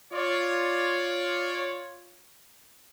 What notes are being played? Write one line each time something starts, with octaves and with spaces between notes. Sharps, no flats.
F4 C#5 D5